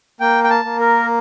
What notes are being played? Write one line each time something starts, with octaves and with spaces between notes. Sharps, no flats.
A#3 G5
G5
A5
A#3
A#4